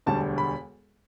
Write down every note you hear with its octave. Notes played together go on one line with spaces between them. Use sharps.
E1 D2 D3 G3 A5
B5